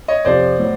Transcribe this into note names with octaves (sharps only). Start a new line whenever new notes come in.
C#5 D#5
F2 C3 F3 C5 D5
A2 F#3